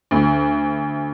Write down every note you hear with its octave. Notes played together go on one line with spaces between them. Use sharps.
D2